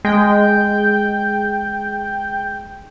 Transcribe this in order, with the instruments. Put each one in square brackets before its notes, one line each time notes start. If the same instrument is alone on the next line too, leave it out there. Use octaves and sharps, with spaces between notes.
[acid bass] G#3 [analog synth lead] G5